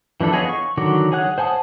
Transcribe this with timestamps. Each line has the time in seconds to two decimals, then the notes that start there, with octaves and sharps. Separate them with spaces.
0.21 E3 F3 D4 A4
0.32 B3 G#4 C#5 D#5 F5
0.49 C#6
0.77 D3 D#3 F#3 F#4 D6
1.12 G#4 C#5 F#5 F#6
1.38 C5 F#5 G#5 A5 D#6